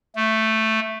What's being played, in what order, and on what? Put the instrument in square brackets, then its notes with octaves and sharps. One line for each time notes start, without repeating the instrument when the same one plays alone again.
[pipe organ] A3